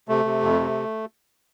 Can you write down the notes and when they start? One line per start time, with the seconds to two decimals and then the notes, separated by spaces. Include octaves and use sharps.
0.09 C3 A3
0.25 C3
0.43 F2
0.60 C3